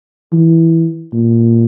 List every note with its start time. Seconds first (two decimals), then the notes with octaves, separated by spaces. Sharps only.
0.33 E3
1.13 A#2